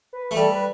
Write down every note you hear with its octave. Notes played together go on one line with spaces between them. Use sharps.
B4
A3
G3 A4
B4